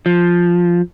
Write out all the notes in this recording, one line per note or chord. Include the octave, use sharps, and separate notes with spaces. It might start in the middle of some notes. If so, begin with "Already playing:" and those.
F3